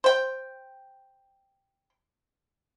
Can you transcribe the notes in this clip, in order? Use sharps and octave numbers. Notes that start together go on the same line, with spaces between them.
C5 G5